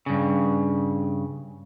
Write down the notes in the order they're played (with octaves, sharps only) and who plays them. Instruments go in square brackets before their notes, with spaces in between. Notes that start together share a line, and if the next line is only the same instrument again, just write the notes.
[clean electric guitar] G2 C#3